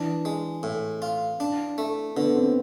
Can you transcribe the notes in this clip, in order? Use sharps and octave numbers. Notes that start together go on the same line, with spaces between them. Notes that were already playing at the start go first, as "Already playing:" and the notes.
Already playing: E3 D4
G#3
A2
F4
D4
A3
D3 B3
C4